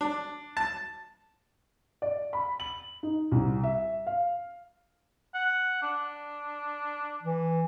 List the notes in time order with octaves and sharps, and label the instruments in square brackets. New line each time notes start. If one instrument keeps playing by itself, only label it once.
[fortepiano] D4
A5
[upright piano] D5
B5
F#7
D#4
C2
E5
F5
[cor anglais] F#5
D4
[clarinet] E3